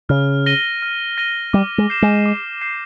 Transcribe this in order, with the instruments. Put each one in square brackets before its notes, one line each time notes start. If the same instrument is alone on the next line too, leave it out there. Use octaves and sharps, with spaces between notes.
[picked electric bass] C#3 [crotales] F6
[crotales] A#6 D#7 G7
F6
A#6 D#7 G7
[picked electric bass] G3 [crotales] D6
[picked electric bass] G#3
[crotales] G6 C7 E7
[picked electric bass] G#3
[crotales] D6
G6 C7 E7